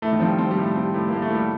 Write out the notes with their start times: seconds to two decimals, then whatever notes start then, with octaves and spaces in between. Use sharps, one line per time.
0.02 A2 A3
0.13 D#3
0.20 F3 C4
0.27 G3
0.38 C4
0.51 G3
0.57 A2
0.76 G3 C4
0.94 A2
1.08 A2 A#3
1.22 A3
1.30 A2 G3